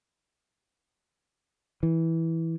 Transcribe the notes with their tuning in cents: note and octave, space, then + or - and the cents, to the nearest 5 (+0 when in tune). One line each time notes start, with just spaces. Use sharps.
E3 -10